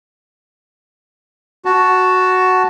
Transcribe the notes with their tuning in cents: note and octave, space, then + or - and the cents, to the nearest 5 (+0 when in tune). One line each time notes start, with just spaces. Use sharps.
F#4 +0 A5 +0